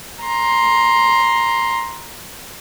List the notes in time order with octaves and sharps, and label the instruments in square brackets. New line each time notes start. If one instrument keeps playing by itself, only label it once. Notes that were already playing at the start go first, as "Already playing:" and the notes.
[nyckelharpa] A#5 C6